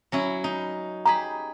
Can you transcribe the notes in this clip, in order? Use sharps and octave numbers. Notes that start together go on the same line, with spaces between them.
F#3 C#4 E4
D#4
G4 G#4 A#5 B5